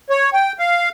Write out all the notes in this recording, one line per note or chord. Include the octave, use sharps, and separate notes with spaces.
C#5
G5
F5